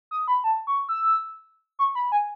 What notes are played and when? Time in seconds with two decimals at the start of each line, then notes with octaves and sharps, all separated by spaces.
0.11 D#6
0.28 B5
0.44 A5
0.67 C#6
0.89 E6
1.79 C#6
1.95 B5
2.12 G#5